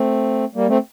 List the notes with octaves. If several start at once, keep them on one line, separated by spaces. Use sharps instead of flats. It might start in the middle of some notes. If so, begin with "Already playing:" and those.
Already playing: A3 C4
G3 A#3
A3 C4